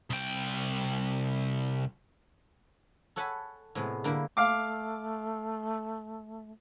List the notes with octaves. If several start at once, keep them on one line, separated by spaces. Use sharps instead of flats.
C2 G5
A4 C#5 F#5 G#5 A5 B5
A2 C3 G#3 B3
D3 G3 A#3 E4 A#4
A3 F5 D6